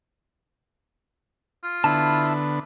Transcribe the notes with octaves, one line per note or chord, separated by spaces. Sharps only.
F4
D3 B3 E4 A5